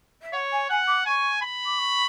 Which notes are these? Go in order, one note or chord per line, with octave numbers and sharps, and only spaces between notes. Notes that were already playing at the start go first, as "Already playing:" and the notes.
E5
C#5 F#5
G#5
F#5 G#5
D6
G#5 C#6
B5
D6
C#6